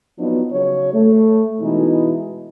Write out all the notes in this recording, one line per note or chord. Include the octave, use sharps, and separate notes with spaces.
F3 F#3 B3 D4 D#4
C#3 F#3 C#5
A3
B2 E3 G#3 D#4 E4